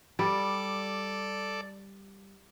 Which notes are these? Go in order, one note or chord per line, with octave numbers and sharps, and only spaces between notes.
G3 A4 D5